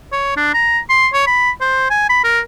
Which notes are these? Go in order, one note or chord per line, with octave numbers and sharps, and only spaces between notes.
C#5
D4
A#5
C6
C#5
B5
C5
G#5
B5
A#4